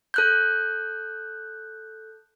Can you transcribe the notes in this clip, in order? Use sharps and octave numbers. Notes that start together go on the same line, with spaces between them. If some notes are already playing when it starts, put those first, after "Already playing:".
A4 F#6 G6